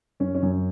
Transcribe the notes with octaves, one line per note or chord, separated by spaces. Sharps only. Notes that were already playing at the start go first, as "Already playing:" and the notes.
F#2 C#4
C#4
F#2